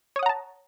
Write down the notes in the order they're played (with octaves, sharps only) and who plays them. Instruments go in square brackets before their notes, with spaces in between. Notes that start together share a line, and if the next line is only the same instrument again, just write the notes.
[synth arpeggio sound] C#5
D#6
F#5
A#5
A5